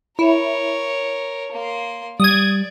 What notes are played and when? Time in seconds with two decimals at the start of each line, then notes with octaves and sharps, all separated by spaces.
0.19 E4 A#4 C#5
1.52 A#3 C6
2.20 G3 D5 D#6 G#6